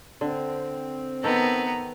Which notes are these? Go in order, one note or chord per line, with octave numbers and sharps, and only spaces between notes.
D3 C4
D#3 B3 A4 G5 A#5